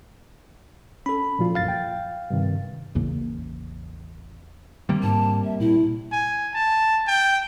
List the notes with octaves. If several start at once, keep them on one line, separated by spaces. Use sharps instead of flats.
C#4 A4 B5
A#2 F3 F4
C2 F#2 F5 A6
G5
G2 C3 D#3
A1 E2 C#3 A#3
C3 D#3 G3 A#3
G#2 A5
E5
A#2 E4
G#5
A5
G5